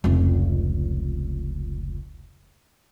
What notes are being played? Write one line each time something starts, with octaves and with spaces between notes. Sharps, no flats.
F1 C#2